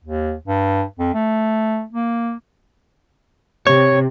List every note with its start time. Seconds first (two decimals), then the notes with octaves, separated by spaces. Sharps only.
0.04 D#2
0.47 G2
0.99 F2
1.14 A3
1.92 A#3
3.67 C3 C#5